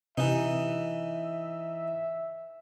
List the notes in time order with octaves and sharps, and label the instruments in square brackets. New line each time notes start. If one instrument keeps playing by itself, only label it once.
[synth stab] C3 [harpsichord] E3 D#4 [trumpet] E5